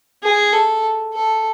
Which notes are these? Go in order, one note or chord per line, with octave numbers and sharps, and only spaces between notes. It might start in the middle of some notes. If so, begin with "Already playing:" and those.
G#4
A4
A4